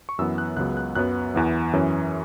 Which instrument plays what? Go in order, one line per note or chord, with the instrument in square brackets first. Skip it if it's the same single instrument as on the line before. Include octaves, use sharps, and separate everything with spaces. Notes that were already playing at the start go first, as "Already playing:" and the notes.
[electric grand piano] C#6
F#2 E3 B3 E6
F#6
C#2 C#3 F#3 B3 F#6
F#6
F#2 F#3 B3 F#6
E2 E3 B3
F#2 E3 C#4